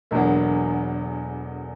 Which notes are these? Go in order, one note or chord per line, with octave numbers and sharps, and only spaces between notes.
E1 E2 D3 F#3 A#3